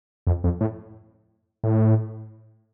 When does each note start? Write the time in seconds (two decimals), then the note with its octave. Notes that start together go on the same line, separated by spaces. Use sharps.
0.27 F2
0.44 F2
0.61 A2
1.64 A2